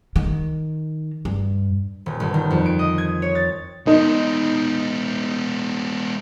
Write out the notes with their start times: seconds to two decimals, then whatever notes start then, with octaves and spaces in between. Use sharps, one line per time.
0.16 D#3
1.25 G2
2.06 D#1
2.20 G1
2.34 D#3
2.51 F2
2.66 D7
2.79 D#5
2.98 G#6
3.22 C#5
3.35 A6
3.87 G#3 B3 D#4